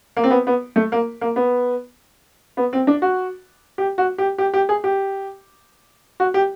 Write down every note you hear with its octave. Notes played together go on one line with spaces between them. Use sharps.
A#3
C4
B3
B3
A3
A#3
A#3
B3
B3
C4
D4
F#4
G4
F#4
G4
G4
G4
G#4
G4
F#4
G4